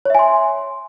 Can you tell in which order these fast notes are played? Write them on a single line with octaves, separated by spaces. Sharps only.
C#5 E5 G#5 C6